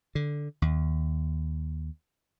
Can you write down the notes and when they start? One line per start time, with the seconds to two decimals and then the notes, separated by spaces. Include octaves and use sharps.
0.15 D3
0.62 D#2